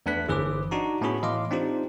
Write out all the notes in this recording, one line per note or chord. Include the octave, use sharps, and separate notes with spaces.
E2 A3 D4 B4 F#6 B6
G1 E3 G#4 B4 C5 D6
D4 D#4 F#4 A#5
A2 B3 C#4 F#4 G#4 B5
A2 E3 D#5 F5 C6 D6
C4 D4 D#4 F4 G4 C5